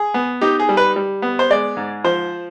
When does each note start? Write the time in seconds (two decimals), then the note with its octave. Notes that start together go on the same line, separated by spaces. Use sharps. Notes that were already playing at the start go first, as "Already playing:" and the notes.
Already playing: G#4
0.14 B3
0.41 D#4 G4
0.60 G#4
0.69 G3
0.77 B4
0.96 G3
1.22 B3
1.39 C5
1.50 G#3 D5
1.77 G#2
2.04 F3 C5